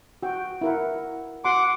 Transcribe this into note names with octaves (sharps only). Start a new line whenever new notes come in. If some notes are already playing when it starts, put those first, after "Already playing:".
F#4 G5
E4 A#4 F#5
F#4 F#5 C6 D6